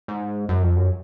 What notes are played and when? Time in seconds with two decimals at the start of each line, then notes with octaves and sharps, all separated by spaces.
0.08 G#2
0.49 F#2
0.63 F2
0.76 F#2